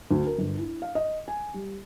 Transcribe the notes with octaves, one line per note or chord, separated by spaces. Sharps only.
D2
A#4
G1
E4
F5
D#5
G#5
G3